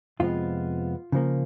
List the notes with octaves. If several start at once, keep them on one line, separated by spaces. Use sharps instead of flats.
F2 C3 F3 G#3 B3 F4
C#3 F3 A#3